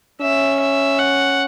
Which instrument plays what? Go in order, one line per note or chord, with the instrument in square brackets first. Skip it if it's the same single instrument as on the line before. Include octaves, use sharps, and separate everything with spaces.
[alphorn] C#4 [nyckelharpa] E5
[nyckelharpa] E5
F#5